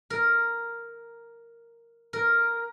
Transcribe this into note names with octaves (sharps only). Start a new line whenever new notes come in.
A#4
A#4